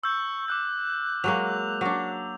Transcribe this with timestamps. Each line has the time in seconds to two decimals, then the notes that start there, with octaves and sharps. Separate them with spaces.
0.04 C#6 E6 G6
0.48 D6 E6 F#6 G6
1.24 F#3 G#3 A#3 F7
1.81 F#3 D4